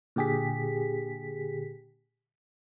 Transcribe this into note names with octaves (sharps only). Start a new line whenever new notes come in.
A#2 D3 G4 G#4 B6